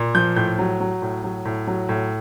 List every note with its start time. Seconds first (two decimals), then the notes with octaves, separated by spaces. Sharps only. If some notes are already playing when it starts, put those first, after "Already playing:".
Already playing: A#2
0.14 F3 G6
0.36 A2 G6
0.58 F#3
0.80 F#3
1.02 A2
1.23 F#3
1.45 A2
1.67 F#3
1.89 A2